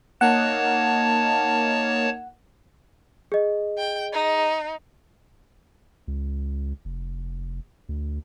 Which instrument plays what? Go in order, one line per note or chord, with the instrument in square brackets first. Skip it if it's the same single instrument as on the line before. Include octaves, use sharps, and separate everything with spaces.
[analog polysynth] A#3 D#4 [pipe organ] C#5 A5 [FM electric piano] F#5
[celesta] G#4 D#5
[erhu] G5
D#4
[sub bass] C#2
F1
D2